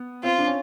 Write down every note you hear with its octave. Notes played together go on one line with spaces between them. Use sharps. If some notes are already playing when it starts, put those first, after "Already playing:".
Already playing: B3
C4 F4
D4
C#4